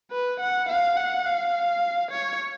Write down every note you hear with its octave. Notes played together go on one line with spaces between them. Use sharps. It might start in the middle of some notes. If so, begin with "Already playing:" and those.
B4
F#5
F5
F#5
F5
C#5